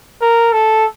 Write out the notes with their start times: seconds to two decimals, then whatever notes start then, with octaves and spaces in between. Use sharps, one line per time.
0.21 A#4
0.53 A4